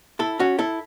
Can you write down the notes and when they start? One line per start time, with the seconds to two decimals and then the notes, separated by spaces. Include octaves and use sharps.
0.19 E4 A4
0.39 C#4 F#4
0.59 E4 A4